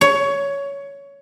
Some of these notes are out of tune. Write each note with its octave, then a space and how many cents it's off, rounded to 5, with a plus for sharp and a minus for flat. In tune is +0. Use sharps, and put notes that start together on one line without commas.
C#5 +15